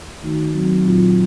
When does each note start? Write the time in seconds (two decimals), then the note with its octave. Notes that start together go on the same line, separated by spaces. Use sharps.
0.22 D#3 A3 D#4 F#4
0.53 F#3 C4 F#4
0.84 A#2 F#3 C4 F4